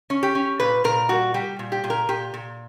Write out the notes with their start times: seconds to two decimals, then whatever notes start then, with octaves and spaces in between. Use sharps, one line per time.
0.10 C#4
0.23 G4
0.35 C#4
0.60 A#2 B4
0.84 A#2 A#4
1.09 G3 F#4
1.34 G3 G4
1.59 A#2
1.72 G4
1.84 A#2
1.90 A#4
2.09 A#2 G4
2.34 A#2